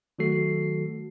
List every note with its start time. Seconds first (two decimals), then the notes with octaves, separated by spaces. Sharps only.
0.19 D#3 F#3 A3 F#4 A4 C7